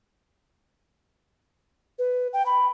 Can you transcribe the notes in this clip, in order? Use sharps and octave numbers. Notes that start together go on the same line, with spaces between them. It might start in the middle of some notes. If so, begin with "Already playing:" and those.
B4
G5
B5